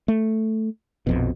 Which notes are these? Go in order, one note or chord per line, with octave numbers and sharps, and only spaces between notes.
A3
A#1 F2 B2